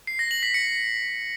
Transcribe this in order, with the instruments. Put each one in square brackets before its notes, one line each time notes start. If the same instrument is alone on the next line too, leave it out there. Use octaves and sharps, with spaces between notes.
[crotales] C7
A#6
F#7
B6
C#7